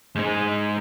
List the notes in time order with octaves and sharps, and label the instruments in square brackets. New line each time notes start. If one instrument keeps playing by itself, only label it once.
[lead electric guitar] G#2 G#3